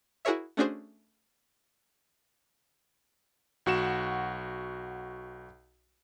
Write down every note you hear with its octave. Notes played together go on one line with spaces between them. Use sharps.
E4 F#4 G#4 A#4 C#5 E5
A3 C#4 D4 F#4 G#4 C5
B1 F#4 F#5 E7